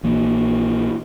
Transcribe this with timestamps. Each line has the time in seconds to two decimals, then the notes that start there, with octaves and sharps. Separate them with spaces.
0.03 A#1 E3 A#3